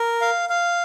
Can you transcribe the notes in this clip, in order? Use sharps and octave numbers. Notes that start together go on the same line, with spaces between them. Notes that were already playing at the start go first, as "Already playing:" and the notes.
Already playing: A#4
F5
F5